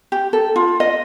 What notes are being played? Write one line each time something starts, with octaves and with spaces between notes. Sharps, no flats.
G4
A4
F4
D#5